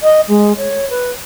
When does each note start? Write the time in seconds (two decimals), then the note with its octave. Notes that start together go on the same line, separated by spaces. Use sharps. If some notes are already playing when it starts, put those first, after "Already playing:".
0.03 D#5
0.28 G#3
0.57 C#5
0.90 B4